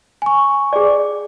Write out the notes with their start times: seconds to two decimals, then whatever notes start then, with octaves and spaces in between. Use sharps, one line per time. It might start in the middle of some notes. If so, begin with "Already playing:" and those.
0.22 G#5 C#6
0.73 G#4 D5